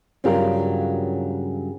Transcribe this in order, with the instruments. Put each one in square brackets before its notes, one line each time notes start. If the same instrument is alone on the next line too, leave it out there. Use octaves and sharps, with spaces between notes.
[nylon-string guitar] G2 C#3 F#3 F4 G4 A#4